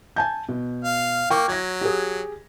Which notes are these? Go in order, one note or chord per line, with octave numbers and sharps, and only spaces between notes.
G#5 A5 G6
B2
F5
A#3 G5 C#6 D6
F#3 G#6 A#6
G4 G#4